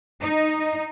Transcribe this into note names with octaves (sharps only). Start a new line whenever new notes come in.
D#4